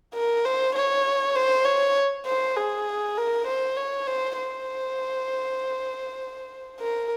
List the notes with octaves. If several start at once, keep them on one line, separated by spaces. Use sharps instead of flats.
A#4
C5
C#5
C5
C#5
C5
G#4
A#4
C5
C#5
C5
C5
A#4